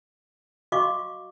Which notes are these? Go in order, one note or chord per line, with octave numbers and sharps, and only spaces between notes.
F#4 D#5 F5 C#6 D6